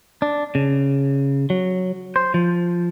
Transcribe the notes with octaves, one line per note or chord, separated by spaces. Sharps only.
D4
C#3
F#3
C5
F3